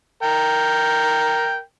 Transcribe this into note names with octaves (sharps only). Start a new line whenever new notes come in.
A#4 G5